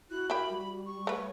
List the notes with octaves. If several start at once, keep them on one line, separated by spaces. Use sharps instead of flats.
E4 F#4 F#6
E4 G4 A#4 B5
G3
C#6
A3 B4 C#5